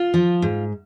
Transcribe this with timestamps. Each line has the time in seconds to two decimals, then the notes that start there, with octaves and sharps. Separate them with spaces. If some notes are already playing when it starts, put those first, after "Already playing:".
Already playing: F4
0.14 F3
0.42 G#2